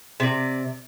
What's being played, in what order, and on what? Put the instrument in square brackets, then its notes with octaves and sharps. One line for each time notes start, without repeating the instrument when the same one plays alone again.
[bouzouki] C3 D5